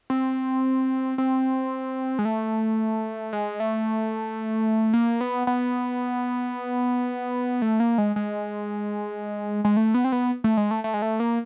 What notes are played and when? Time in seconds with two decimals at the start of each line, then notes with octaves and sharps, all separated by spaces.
0.10 C4
1.18 C4
2.19 G#3
2.25 A3
3.33 G#3
3.60 A3
4.94 A#3
5.21 B3
5.47 B3
7.62 A3
7.80 A#3
7.98 G#3
8.16 G#3
9.65 G#3
9.77 A3
9.94 B3
10.04 C4
10.12 B3
10.44 A3
10.57 G#3
10.71 A3
10.84 A3
10.94 G#3
11.02 A3
11.20 A#3